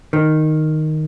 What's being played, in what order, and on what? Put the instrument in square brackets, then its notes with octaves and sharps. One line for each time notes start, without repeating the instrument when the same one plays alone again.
[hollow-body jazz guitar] D#3